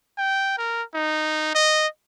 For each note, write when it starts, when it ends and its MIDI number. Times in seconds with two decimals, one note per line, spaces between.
0.17 0.56 79
0.58 0.83 70
0.94 1.51 63
1.55 1.87 75